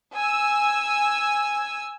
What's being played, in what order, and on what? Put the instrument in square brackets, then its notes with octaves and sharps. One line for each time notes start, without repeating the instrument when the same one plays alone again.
[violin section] G#5 E6